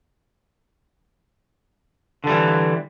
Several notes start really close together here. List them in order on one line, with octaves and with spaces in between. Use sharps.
D3 G3 E3